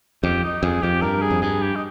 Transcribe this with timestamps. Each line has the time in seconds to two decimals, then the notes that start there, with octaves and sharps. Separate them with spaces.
0.23 F2 G4
0.44 D#4
0.63 F2 G#4
0.82 F2 G4
1.02 G2 A#4
1.22 G#4
1.31 F2
1.42 G2 G#4
1.61 G4
1.76 D#4